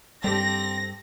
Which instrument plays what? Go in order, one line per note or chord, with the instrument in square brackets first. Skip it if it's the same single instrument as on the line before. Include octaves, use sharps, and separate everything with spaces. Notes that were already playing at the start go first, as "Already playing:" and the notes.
[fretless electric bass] G2 G3 [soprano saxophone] C4 [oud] G4 A4 D5 [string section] A#6